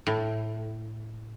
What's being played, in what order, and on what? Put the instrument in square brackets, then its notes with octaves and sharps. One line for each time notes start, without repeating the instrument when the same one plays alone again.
[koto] A2